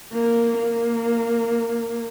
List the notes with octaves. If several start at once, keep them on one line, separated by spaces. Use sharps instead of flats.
A#3
A#3